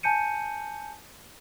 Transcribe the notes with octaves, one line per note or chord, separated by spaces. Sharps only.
G#5 A5 G6 C#7 D#7